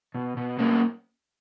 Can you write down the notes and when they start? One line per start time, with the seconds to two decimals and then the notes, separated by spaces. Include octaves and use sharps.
0.15 B2
0.37 B2
0.59 B2 A#3 C#4